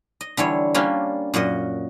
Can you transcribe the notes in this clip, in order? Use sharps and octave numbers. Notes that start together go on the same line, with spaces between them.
D#5
D3 E3 G3 C#5
G3 A#3 C#4 D4 F4
F#2 A#2 F#4 D#5